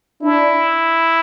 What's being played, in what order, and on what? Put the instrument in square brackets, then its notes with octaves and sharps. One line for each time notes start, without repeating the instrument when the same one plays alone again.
[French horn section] D4 [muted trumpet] E4